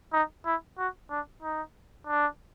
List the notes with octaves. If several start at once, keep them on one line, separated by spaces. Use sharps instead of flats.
D#4
E4
F#4
D4
D#4
D4